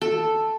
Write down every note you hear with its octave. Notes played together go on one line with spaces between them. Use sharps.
A4